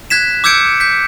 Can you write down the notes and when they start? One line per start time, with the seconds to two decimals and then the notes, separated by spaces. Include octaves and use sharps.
0.10 F#6 G#6 B6 E7
0.44 D6 E6 G6 G#6 C#7 D7
0.80 G6 B6